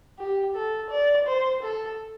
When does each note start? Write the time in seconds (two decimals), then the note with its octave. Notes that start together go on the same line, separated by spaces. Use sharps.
0.19 G4
0.54 A4
0.90 D5
1.27 C5
1.63 A4